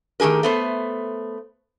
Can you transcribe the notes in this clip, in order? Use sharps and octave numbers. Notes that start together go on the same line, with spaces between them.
D#3 A3 G4 G#4 A#4
A3 B3 C5